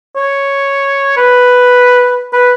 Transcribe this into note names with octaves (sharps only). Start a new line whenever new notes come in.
C#5
B4
B4